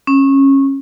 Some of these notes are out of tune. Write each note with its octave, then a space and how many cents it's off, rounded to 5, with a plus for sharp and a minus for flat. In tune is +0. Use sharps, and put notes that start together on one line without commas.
C#4 -20